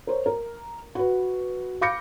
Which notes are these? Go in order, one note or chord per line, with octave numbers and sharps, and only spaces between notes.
A#4 C5 C#5
A#4
F#4 B4
F5 B5 D6 G6 A#6 C#7